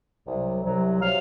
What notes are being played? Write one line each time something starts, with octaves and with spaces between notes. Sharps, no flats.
C2 C3 F#3
C2 C3 F#3
C3 F#3 F5